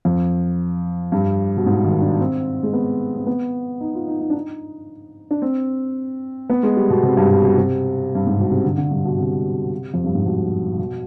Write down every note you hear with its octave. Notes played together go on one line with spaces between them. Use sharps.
F2
G2
B2
G#2
D#3
D4
C4
G#3
B3
C4
B3
D#4
F4
D#4
D#4
D4
D#4
D4
C4
B3
G#3
G3
B2
C3
G2
B2
B2
C3
G2
G#2
B2
C3
D3
D3
G2
B2
C3
F2
G2
G#2
B2
B2